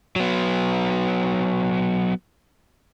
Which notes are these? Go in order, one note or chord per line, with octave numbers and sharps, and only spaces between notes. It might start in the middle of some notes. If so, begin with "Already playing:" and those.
F#3 B3